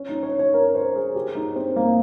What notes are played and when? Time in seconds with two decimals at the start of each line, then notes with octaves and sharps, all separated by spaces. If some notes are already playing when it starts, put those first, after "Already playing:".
Already playing: C#4
0.09 D#4
0.23 C#5
0.39 C#5
0.54 A#4
0.75 C5
0.95 G#4
1.16 G4
1.35 D#4
1.56 C4
1.76 A#3